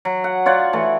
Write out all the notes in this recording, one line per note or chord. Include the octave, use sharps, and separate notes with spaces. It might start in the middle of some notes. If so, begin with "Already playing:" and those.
F#3
F#5
F4 C#5 D5 F#5
E3 A3